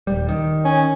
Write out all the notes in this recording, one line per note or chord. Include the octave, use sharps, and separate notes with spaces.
D#1 G3
D#3
C#4